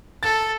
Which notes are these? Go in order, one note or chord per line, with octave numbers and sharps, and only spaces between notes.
A4 A6